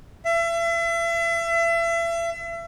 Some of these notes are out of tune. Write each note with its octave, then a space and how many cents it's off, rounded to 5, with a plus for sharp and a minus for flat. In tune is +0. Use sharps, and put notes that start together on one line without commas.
E5 +35